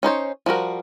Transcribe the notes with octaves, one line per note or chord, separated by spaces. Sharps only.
C#4 D#4 C5 C#5
F3 G3 F#4 A#4